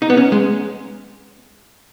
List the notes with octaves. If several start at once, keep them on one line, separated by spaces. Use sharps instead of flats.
D#4
B3
C#4
G#3